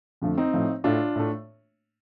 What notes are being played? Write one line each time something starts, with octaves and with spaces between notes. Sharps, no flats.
F2 D3 F3 A3
C4 D#4
A2 F3 A3
A2 A3 D4 F4
A2 A3